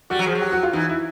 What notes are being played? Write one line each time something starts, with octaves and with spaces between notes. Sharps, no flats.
G3 F#4
F#3
F3 G#4
F#3
G4
F#4
F4
E3 D#4
E4